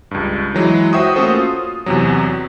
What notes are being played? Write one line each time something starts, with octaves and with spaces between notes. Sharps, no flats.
C#2 G2
E3 F#3 G#3 E4
F#4 C5 E5 G5 C#6 D#6
A3 A#3 C#4 F#4 A4 C5
F4
E2 C3 F#3